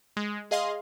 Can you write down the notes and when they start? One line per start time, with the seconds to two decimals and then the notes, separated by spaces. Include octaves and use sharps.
0.17 G#3
0.51 G#4 D#5 F5 C6